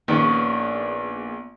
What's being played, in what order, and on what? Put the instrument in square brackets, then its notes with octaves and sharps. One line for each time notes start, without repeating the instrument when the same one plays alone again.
[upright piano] A#1 [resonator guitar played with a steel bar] D#3 C#4 [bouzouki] B3 D4 G#4